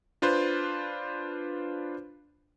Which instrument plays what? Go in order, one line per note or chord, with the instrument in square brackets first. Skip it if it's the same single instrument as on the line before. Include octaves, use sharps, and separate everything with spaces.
[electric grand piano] D4 F4 B4 C5